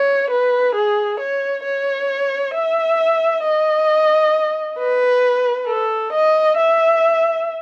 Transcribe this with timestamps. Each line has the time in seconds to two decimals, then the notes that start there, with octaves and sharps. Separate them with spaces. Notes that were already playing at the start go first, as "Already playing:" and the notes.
Already playing: C#5
0.30 B4
0.75 G#4
1.20 C#5
1.65 C#5
2.54 E5
3.44 D#5
4.79 B4
5.67 A4
6.13 D#5
6.57 E5